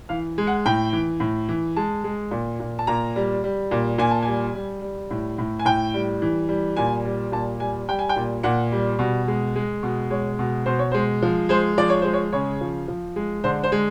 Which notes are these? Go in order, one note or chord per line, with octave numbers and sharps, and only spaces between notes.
E3 F5
G#3
F#5
A2 G5
E3
A2
E3
G#3 A5
G#3
A#2
A#2
A5
A#2 A#5
G3
G3
A#2
A#2 G#5
A5
G3 G#5
G3
G3
A2
A2
G#5
A2 G5
G3
E3
G3
A#2 G#5
G3
A#2 A5
G3 G#5
G3 G5
G#5
G5
A#2
A#2 F#5
G3
B2
G#3
G#3
B2
G#3 C#5
B2
B2 C5
C#5
G#3 C5
F3
G#3 C5
F3 D5
C#5
G#3 C5
C#5
C#3 C#5
F3
F3
G#3
D3 C5
C5
G#3